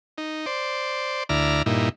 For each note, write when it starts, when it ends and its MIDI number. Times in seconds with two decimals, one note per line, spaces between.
0.18 0.46 63
0.46 1.23 72
0.46 1.23 74
1.29 1.62 38
1.29 1.62 64
1.29 1.62 74
1.29 1.62 82
1.29 1.62 89
1.66 1.89 43
1.66 1.89 46
1.66 1.89 63
1.66 1.89 64